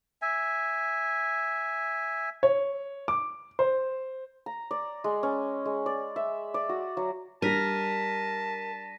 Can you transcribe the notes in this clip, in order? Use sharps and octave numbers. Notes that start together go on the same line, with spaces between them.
E5 G#5
C#5
D6
C5
A#5
D5
G#3
C#4
G#3
D5
E5
D5
F#4
F#3
G3 D4 A#4 A5 A#6 B6 D#7